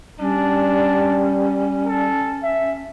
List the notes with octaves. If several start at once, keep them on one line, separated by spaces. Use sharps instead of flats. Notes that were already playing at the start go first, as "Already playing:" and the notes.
G3 C#4 D4
A4
E5